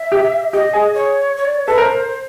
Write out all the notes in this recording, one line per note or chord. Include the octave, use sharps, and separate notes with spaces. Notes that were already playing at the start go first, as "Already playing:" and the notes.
Already playing: E5
G4
G4 D#5
G#4
C#5
C#5
D5
C#5
A4 B4
A#4 C5